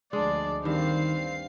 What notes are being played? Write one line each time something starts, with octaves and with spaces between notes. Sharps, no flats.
D2 F3 G#3 D4 D5
G2 D#3 C4 F5 C7